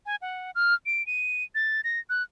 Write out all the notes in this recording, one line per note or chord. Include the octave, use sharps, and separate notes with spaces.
G#5
F#5
F6
D7
D#7
A6
A#6
F#6